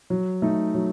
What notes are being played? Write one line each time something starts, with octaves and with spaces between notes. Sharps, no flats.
F#3
A3 D#4
F#3